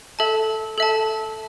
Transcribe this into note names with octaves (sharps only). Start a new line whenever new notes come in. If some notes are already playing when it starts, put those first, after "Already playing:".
A4 E5 A5
A4 E5 A5